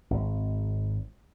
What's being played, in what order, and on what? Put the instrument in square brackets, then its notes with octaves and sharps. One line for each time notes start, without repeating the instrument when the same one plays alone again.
[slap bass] G#1